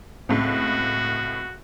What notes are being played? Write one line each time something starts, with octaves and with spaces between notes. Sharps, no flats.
C#2 A2 C4 F#4